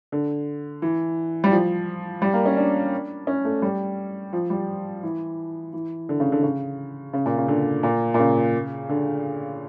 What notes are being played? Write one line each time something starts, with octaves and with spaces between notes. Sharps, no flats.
D3
E3
G3
F3
G3
A#3
C#4
D4
C#4
A3
G3
F3
G3
E3
E3
D3
C#3
D3
C#3
C#3
A#2
C#3
D3
A#2
A#2
C#3
D3